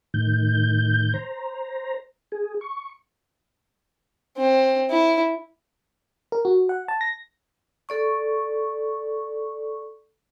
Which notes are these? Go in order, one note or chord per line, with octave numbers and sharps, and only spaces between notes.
A2 D#3 G6
C5 A#5
G#4
C#6
C4
E4
A#4
F#4
F#5
A5
A#6
A4 D5 C#6